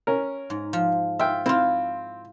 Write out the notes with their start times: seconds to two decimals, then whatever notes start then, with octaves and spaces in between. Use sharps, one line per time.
0.07 C#4 A#4
0.50 G#2
0.73 F3
1.19 F4 E5 G5
1.46 C4 E4 F4